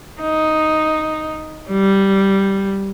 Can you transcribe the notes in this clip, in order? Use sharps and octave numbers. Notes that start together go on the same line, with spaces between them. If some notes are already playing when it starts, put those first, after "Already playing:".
D#4
G3